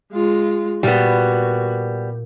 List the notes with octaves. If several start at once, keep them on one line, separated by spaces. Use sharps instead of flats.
G#3 F4
A#2 G3 B3 F#4 E5 F#6